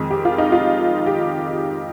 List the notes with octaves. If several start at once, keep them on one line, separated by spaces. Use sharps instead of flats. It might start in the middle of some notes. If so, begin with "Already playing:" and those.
Already playing: F2 D#3 G#3
G4
F4
D#4
F4
G4